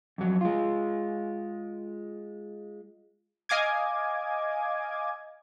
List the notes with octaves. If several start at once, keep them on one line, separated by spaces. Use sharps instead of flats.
F2 F#3
G#3 F4
D#5 F5 G#5 D6 G#6